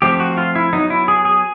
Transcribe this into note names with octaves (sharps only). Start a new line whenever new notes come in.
F3 A3 C4 G4
F#4
F4
E4
F#3 B3 D#4
E4
G#4
G#4